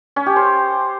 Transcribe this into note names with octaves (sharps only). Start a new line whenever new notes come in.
C#4
G4
C5